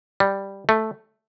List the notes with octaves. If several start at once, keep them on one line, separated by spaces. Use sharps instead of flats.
G3
A3